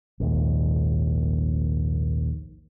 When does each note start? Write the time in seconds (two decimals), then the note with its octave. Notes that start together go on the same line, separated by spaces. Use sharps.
0.20 A#1 D#2 G#2